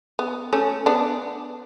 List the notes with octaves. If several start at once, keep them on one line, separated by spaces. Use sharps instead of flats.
B3
A3 C#4
B3 D4